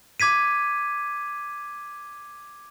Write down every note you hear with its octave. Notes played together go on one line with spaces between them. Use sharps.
D6 G#6 B6 D#7